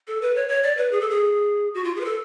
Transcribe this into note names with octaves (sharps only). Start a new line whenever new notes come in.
A4
B4
C#5
C#5
D5
B4
G#4
A4
G#4
F#4
F4
G#4
B4
A4